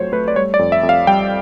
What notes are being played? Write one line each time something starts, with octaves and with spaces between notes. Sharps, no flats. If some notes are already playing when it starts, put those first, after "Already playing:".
Already playing: F2 F#3 A3 C5 C#5
A3 B4
D5
G3 C#5
D5
F2
E5
F2
F5
G3 G5